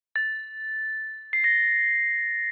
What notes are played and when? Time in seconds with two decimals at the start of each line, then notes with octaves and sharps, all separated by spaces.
0.16 A6
1.33 C7
1.44 A#6